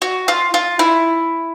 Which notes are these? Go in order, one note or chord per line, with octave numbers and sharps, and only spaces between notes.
F#4
F4
F4
E4